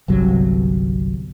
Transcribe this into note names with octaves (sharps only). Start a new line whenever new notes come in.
G1 C2 C3 F#3